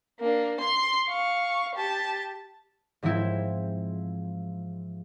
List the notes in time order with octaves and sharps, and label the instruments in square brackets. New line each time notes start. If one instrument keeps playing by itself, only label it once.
[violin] A#3 D4
C6 C7
F5 C#6
G4 A5
[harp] G#2 E3 F3 C4 E4